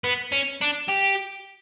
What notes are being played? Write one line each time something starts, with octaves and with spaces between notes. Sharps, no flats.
B3
C#4
D4
G4